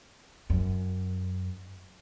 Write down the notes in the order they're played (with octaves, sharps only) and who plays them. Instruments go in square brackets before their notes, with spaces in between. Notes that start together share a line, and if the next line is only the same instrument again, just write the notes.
[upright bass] F#2